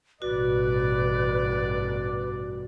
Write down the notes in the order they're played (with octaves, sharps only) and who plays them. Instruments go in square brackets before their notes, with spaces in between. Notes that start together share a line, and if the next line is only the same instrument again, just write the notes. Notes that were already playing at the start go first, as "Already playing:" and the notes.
[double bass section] A1 G2 B2 [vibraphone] F#4 [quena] B4 [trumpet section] D5